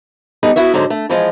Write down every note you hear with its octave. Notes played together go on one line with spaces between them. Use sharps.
G3 B3 D#4 G#4 A4
B3 E4 F#4 E5
G#2 D3 F#3 C5
A3
E3 F3 G#3